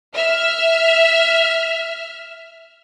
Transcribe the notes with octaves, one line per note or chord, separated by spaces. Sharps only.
E5 F6